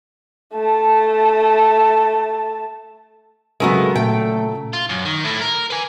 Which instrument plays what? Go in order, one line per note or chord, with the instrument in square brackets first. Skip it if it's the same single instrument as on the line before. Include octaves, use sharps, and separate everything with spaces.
[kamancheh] A3 A5
[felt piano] C#3 F#3 [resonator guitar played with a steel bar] G#3 A3 B3 [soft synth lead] A#4
[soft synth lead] A#2 [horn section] A3 [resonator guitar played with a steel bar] G5
[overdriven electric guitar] F4
F#2
D#3
A3 E4
A#4
B4 G#5